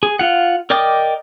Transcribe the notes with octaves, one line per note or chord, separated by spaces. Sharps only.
G#4
F4 F#5
A#4 D5 D#5 G5 D6